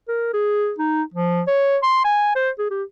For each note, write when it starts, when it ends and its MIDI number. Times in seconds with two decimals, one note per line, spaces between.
0.08 0.32 70
0.33 0.73 68
0.79 1.02 63
1.14 1.41 53
1.47 1.77 73
1.83 2.00 84
2.04 2.32 80
2.35 2.50 72
2.58 2.66 68
2.70 2.83 67